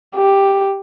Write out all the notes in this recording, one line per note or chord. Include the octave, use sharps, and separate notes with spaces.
G4